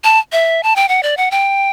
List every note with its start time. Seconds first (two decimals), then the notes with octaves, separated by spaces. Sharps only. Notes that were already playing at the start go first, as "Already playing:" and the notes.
0.04 A5
0.32 E5
0.63 A5
0.76 G5
0.88 F#5
1.03 D5
1.17 F#5
1.31 G5